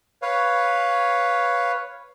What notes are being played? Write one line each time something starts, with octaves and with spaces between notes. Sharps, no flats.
B4 C#5 F5